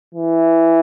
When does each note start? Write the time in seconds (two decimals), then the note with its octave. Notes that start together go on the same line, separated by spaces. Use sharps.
0.15 E3